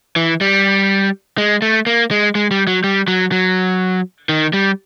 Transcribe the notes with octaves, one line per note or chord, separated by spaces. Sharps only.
E3
G3
G#3
A3
A#3
G#3
G#3
G3
F#3
G3
F#3
F#3
D#3
G3